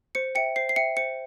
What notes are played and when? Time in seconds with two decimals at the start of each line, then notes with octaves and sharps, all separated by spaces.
0.15 C5 C#7
0.35 E5 G5 C#7
0.56 C5 C7
0.69 C7
0.76 E5 G5 C#7
0.97 C5 C#7